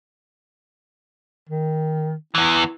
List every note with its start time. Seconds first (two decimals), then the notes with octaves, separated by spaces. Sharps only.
1.49 D#3
2.35 E2 E3 E4